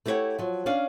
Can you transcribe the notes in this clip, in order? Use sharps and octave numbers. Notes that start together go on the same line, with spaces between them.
A3 E4 G4 G#4 C#5 F#5
F3 F#3
C#4 D4 D5 F5